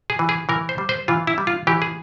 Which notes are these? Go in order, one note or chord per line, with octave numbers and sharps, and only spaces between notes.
G#4
E3
G#4
E3 A#4
C5
G3
C5
E3 F4
E4
G3
F4
E3 G4
G#4